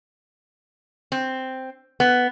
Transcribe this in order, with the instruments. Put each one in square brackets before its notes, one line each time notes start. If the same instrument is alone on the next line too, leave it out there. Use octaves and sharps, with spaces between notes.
[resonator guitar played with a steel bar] C4
B3